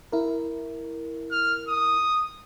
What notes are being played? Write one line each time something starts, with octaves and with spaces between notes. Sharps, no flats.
E4 A#4
F6
D#6